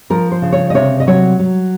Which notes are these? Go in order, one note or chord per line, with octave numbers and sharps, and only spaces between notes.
F3 A#4
C5
C#3
C#5
D#5
C3 C#5
D#5
F#3 C#5
F#3